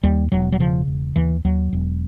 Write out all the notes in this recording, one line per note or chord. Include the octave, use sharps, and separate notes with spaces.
D#2 G3
E1 F#3
F#3
C#3 F3
E1
D#2 E3
D#2 F#3
E1